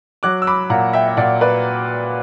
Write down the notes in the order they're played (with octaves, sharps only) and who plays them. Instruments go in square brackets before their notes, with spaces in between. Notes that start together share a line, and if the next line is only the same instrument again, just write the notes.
[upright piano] F#3 D6 F#6
E6
B5 D6
A#2 F#5 A#5
E5 G5
E5
A#2 D5 F#5
B4 D5